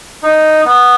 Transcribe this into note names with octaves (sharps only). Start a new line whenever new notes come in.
D#4
B3